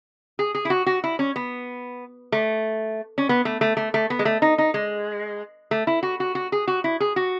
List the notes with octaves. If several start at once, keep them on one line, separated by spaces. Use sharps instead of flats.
G#4
G#4
E4
F#4
F#4
E4
C#4
B3
A3
C#4
B3
A3
A3
A3
A3
B3
G#3
A3
D#4
D#4
G#3
A3
E4
F#4
F#4
F#4
G#4
F#4
E4
G#4
F#4